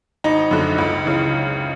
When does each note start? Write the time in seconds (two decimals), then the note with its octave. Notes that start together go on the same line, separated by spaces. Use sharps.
0.24 G#1 D#4
0.51 F#2 D3
0.78 C#2
1.05 C#3 E3